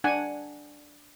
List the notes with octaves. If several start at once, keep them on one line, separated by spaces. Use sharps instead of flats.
D4 F#5 G#5